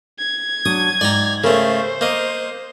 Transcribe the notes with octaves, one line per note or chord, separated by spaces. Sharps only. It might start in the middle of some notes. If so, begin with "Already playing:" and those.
G#6
F#3 D4 D#6
G#2 D5 G5 A#5
C#3 A3 A#4 C5
A#3 D#5